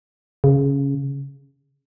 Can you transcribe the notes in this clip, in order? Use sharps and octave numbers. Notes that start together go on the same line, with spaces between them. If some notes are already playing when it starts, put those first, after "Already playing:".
C#3